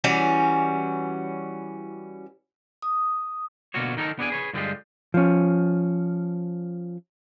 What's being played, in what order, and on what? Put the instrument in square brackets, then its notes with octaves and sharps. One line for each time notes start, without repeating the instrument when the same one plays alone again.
[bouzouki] E3 G3 C#4 F#4
[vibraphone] D#6
[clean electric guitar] B2 D3 A#3 F4 F#4 C#5
D#3 D#4 F#4 A4 A#4
B3 D4 G#4 D5 E5 G#5
G#4 B4 C#5
G2 D3 F3 G3 G#3 F4
[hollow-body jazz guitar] F3 C#4